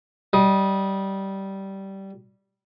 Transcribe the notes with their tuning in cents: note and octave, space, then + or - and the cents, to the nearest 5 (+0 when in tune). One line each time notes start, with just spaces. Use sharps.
G3 -15 D#5 +0